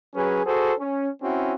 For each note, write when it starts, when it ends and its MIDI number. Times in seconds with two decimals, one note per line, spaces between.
0.15 0.40 54
0.15 0.40 61
0.15 0.40 68
0.15 0.40 71
0.45 0.73 66
0.45 0.73 68
0.45 0.73 69
0.45 0.73 72
0.78 1.09 61
1.22 1.54 60
1.22 1.54 61
1.22 1.54 64
1.22 1.54 66